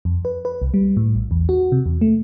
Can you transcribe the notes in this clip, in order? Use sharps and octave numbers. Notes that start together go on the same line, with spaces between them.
F2
B4
B4
C2
G3
A2
A#1
E2
F#4
C3
E2
A3